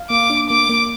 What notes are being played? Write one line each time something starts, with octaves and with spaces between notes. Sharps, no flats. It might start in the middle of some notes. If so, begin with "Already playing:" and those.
Already playing: F5
A#3 D6
D4
A#3 D6
A#3